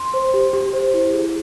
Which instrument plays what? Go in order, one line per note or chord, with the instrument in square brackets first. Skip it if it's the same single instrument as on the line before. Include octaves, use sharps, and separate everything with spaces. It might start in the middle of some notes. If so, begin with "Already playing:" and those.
Already playing: [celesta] C6
C5
G4
G4
C5
E4
G#4